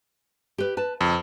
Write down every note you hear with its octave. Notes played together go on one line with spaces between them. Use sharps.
G4 B4
B4 A5
F2 C#3